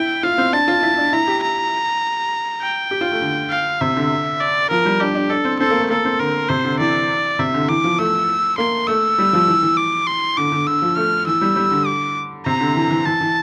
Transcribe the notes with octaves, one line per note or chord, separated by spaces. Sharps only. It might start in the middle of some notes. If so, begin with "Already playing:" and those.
Already playing: E4 G5
F4 F5
C4
D4 A5
F4
E4
D4
E4 A#5
G4
A#5
G5
G4
F4
A3
D3
F5
C3 E5
D3
D5
F3 A#4
G3
D4 G4
D4
D4 A4
C4
C4 A4
A#3
A3
A#3 A4
C4
D3 A#4
C3 C5
D3
E3 D5
C3 E5
D3
E3 D6
F3
A3 E6
A#3 C6
A3 E6
G3
F3
E3
E3
D6
C6
D3 D6
D3
D3 E6
F3
A3 F6
E3 E6
G3
G3
D3
D6
C3 A#5
D3
E3
E3
E3 A5
E3